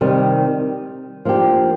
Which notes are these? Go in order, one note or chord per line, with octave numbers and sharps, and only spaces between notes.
C3 D#3 G3
F3 A#3 D4 G4